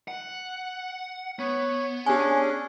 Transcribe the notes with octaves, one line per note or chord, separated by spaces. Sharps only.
F#5
B3 C#5
C#4 D4 G4 G#4 G#5